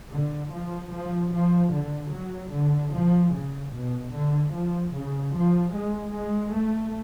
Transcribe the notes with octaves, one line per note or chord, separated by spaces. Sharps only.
D3
F3
F3
F3
D3
F#3
D3
F3
C#3
B2
D3
F3
C#3
F3
G#3
G#3
A3